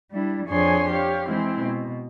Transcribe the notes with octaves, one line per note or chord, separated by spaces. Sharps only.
G3 D4 E4
F2 D4 G#4 C#5 G#5 C6
G4 C#5 F5
E3 G#3 C4 E4 C5
B2